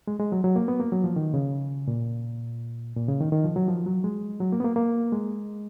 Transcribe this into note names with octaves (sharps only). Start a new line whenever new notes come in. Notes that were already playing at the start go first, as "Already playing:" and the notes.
G#3
G#3
F#3
F#3
A#3
B3
A#3
F#3
F3
D#3
C#3
A#2
A#2
C#3
D#3
D#3
F3
F#3
F3
F#3
G#3
F#3
A#3
B3
A#3
A#3
G#3